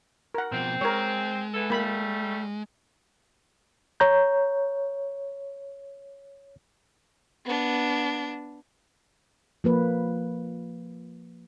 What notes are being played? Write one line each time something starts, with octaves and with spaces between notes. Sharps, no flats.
A#4 F#5
B2 F3 C4
G#3 A#4 C#5
E3 B3 A4
G3 A3 A#3 B5
C#5 A#5 G6
B3 D4
F3 A#3 B4